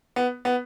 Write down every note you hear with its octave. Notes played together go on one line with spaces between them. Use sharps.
B3
B3